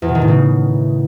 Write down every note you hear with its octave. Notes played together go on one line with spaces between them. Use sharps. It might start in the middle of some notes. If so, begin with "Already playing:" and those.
E2
B2
D#3
A2
C#3